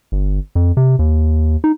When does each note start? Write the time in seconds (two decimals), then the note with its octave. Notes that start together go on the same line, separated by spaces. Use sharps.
0.12 G1
0.55 F2
0.77 C3
0.99 D#2
1.64 D#4